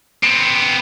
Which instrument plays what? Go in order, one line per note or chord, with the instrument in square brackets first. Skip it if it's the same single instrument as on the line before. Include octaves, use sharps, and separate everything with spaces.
[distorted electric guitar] B3 C4